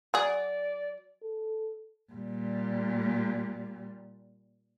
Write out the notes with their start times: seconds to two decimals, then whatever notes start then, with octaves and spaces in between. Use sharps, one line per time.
0.14 F#3 G#4 D5
1.23 A4
2.13 A#2 G3